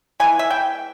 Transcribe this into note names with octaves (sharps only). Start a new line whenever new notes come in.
E3 G#3 B3 G#5
E5
G5